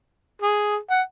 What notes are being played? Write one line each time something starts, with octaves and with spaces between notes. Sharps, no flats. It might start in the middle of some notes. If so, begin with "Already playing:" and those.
G#4
F#5